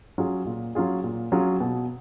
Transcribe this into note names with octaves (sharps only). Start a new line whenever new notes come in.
F#3 C#4 F4 G#4
A#2
F#3 C#4 F4 G#4
A#2
F#3 C#4 F4 G#4
B2